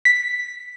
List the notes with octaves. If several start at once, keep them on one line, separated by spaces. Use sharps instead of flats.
B6